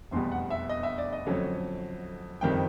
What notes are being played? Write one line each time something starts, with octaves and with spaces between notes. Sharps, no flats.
F1 E2 B2 G3 C6
F#5
E5
D#5
E5
D5
D#5
F2 D3 F#3 A3 C#4
F#1 F2 C3 D#3 G3 G5